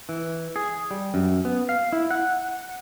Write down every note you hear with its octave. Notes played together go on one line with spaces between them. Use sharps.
E3
G#4
G3
F#2
B3
F5
E4
F#5